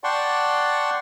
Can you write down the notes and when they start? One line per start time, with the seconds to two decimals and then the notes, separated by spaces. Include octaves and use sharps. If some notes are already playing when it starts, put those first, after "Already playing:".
0.04 D5 F#5 G5 A5 C6 C#6